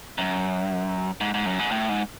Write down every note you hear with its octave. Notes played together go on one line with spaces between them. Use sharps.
F#2
G#2
G#2
F#2
G#2
A2
G#2